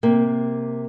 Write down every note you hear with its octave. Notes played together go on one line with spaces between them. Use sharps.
C3 A#3